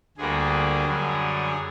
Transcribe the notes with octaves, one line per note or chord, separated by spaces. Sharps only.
D2 D3 G3 A#3 G#4
F#2 D3 G3